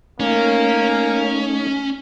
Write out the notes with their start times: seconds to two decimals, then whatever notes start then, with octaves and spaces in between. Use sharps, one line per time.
0.20 A3 A#3 C#4 D#4